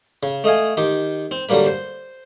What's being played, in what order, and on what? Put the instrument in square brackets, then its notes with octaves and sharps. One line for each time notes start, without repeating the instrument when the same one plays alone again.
[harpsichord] C#3
A3 D#5 F5 G#5
D#3 G4
C4
D3 F#3 G3 A#3 B4
C5